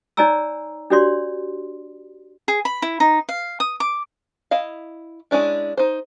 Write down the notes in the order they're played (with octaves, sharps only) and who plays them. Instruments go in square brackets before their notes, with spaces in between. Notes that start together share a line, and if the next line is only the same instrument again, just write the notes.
[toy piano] D#4 C#5 D5 G#5 A#5 E6
D4 F#4 G4 C#5 D5 C6
[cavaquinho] G#4
B5
E4
D#4
F5
D#6
D6
[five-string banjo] E4 D#5 F5
G#3 C#4 D4 E4
D#4 C5